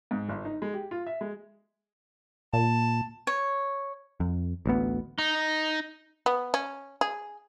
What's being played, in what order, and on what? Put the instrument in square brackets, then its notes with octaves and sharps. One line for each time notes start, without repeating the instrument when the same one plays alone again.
[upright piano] G#2
G1
D#4
G#3
G4
F4
E5
G#3
[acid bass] A#2 [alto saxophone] A5
[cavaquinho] C#5
[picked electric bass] F2
A1 D2 B3
[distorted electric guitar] D#4
[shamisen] B3
C#4
G#4